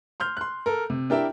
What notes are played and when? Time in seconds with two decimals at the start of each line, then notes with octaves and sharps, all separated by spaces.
0.20 C6 F6 G6
0.37 C6 F#6
0.66 A4 A#4
0.90 C3
1.10 D4 E4 G4 A#4 E5 G5